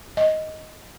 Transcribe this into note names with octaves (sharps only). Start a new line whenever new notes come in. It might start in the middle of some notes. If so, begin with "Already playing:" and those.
D#5